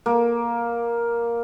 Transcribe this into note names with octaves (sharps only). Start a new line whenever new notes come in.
A#3